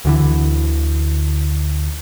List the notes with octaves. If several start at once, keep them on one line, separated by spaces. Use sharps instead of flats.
D2 D3 E3